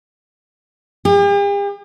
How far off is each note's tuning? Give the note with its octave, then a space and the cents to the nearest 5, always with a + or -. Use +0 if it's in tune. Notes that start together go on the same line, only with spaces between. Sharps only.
G4 +45